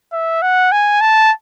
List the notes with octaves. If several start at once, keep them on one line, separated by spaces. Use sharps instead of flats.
E5
F#5
G#5
A5